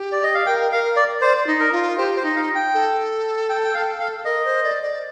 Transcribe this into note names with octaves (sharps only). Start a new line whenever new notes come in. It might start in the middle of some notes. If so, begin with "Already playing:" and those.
Already playing: G4
D5
D#5
F5
A#4 G5
A#4 F5
D5
C5 D5
D#4
A#4
F4
G4 C5
C5
D#4
F5
G5
A4
G5
G5
F5
F5
A#4 D#5
C5
D5
D5